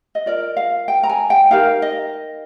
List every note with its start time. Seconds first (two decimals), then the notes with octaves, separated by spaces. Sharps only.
0.15 D#5
0.26 F4 A#4 D5
0.57 F5
0.88 G5
1.03 A#5
1.09 G#5
1.30 G5
1.51 D#4 G4 A#4 F5
1.82 D#5